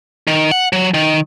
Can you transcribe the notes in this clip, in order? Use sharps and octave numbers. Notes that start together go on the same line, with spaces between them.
D#3
F#5
F#3
D#3